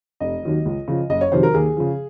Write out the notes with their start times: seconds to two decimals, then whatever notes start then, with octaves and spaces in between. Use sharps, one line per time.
0.20 F1 D#5
0.43 D#2 D#3 F#3
0.65 C#2
0.88 C#3 F3
1.10 F#1 D#5
1.21 C#5
1.32 F2 C3 D#3 F#3 C5
1.43 A#4
1.54 D#2 G#4
1.77 C#3 F3